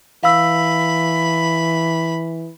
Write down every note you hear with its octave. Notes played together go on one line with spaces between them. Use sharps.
E3 F5 B5 E6